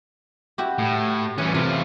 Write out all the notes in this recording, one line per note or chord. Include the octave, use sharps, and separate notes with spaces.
E4 F#4 G4
A2
E3 G3 C#4
A2 C3 F4